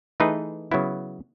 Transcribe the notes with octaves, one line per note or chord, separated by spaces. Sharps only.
E3 A3 D#4 G#4 B4
C#3 F#3 B3 E4